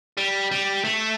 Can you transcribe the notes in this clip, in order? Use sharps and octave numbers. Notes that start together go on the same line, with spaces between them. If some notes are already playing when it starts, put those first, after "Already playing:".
G3
G3
A3